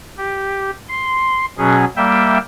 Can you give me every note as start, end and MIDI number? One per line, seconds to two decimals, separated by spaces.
0.18 0.71 67
0.89 1.45 84
1.58 1.85 47
1.58 1.85 54
1.58 1.85 61
1.58 1.85 68
1.97 2.38 55
1.97 2.38 58
1.97 2.38 76
1.97 2.38 79